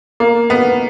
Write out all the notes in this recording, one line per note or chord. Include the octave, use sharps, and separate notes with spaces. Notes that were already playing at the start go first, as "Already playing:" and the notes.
A#3
B3